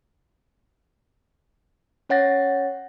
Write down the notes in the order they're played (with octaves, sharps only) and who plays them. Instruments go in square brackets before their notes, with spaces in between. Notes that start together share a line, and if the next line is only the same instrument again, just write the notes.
[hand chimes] C#4 C#5 F#5 A6 A#6